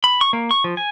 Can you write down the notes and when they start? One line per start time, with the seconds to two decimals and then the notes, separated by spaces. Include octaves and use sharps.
0.04 B5
0.21 C#6
0.33 A#3
0.51 C#6
0.64 F3
0.77 G#5